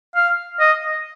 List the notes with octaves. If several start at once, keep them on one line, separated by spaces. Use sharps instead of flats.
F5
D#5